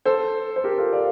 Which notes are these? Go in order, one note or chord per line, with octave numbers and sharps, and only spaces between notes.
A4 C5
C5
G4 A#4
F4 A4
D5 F5